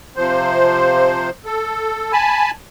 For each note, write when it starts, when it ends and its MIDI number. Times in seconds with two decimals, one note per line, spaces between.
0.16 1.30 48
0.16 1.30 53
0.16 1.30 72
1.46 2.12 69
2.12 2.51 80
2.12 2.51 81
2.12 2.51 83